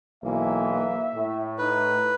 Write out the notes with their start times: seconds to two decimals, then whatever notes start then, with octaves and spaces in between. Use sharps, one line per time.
0.24 B1 E3 A#3 E5
1.16 A2
1.58 D#4 B4